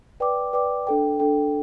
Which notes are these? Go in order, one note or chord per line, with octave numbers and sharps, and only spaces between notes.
B4 D5 G5 D6
B4 D5 G5 D6
D4 A4 G5
D4 A4 G5